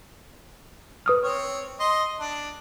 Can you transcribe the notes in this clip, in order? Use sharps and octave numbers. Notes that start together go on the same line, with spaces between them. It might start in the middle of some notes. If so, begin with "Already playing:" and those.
B4 D#6 F6
C4 C#5
D#5 C6
D4